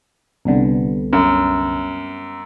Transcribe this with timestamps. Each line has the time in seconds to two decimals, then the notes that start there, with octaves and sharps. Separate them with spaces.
0.45 C2 D3 G3 B3 C4
1.13 F#2